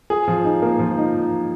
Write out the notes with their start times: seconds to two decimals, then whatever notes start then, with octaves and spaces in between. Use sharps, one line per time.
0.10 G#4
0.28 F3
0.44 D#4
0.62 A#3
0.79 F3
0.97 D#4